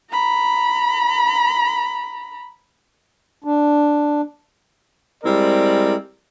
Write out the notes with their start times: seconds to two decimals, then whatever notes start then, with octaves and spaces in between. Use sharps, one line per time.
0.10 A#5 B5
3.44 D4
5.24 G3 G#3 C4 E4 A#4 D5